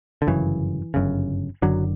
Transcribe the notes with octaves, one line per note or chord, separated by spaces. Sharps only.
D3
G1 F#2 C#3 E3
G1 F#2 C#3
F#1 F#2 D3 F#3